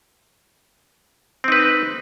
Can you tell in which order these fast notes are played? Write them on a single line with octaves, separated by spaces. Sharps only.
C4 D#4 B4